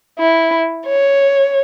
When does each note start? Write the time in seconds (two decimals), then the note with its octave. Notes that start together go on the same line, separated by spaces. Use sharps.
0.19 E4
0.87 C#5